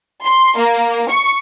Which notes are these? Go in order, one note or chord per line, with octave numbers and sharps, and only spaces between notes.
C6
A#3
C#6